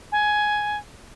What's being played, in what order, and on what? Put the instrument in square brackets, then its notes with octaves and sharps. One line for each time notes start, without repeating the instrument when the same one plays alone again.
[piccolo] G#5